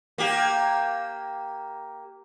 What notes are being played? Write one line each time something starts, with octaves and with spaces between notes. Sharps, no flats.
A#3 G4